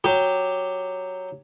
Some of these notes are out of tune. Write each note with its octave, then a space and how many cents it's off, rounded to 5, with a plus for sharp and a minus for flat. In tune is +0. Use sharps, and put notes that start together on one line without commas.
F#3 +0 G4 +0